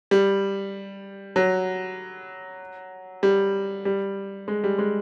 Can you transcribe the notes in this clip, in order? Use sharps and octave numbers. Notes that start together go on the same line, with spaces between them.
G3
F#3
G3
G3
G#3
G3
G#3